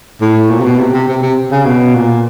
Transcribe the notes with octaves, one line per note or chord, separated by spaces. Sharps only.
A2
A#2
C3
B2
C3
C3
C3
C3
C#3
B2
A#2